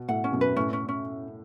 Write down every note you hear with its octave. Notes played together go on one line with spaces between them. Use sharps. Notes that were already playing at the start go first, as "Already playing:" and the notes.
Already playing: B2
A2 F#5
C#4
F#2 B2
B4
A2 C#4
C#4
C#4